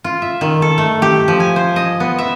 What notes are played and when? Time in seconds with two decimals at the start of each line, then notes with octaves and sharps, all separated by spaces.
0.04 F4
0.22 E5
0.41 D#3
0.62 A4
0.78 A3
1.02 G4
1.28 F3
1.40 G#5
1.56 C5
1.76 D#5
2.00 B3
2.18 E5